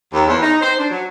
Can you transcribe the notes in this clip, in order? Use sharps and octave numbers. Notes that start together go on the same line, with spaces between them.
D#2
E2
D#4
C5
D4
F#3